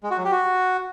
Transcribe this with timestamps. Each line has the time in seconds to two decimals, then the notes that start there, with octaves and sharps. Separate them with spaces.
0.03 G#3
0.10 F#4
0.18 F#3
0.25 G4
0.32 F#4